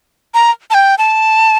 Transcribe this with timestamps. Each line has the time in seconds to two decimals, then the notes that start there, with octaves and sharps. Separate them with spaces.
0.34 A#5
0.70 A5
0.74 G5
0.98 A5